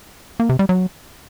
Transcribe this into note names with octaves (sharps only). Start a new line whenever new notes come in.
A#3
C3
G3
F#3